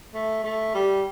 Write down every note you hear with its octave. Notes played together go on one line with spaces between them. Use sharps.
A3
A3
G3